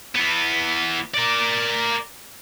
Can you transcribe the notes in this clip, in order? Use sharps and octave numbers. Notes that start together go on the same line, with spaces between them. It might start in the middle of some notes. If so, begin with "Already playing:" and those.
E3 B3
A#4 D5